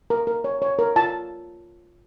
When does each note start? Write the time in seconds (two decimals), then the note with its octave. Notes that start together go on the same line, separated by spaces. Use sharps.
0.10 A#4
0.27 A#4
0.44 C#5
0.62 C#5
0.79 A#4
0.96 F4 A5